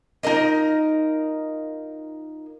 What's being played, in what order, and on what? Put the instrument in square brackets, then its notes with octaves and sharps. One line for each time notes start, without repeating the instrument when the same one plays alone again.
[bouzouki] D#4 F4 A#4 D#5